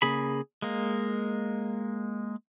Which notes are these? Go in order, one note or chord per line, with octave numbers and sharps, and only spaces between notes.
C#3 A#3 G#4 B5
G#3 A#3